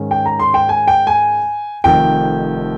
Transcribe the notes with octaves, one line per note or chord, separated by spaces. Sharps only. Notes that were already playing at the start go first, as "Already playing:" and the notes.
Already playing: G#2 D#3 G#3 C#4
G5
A#5
C6
G5
G#5
G5
G#5
F1 F2 D#3 G5